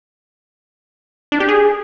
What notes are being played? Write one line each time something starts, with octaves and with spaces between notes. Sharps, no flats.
D4
G4
G#4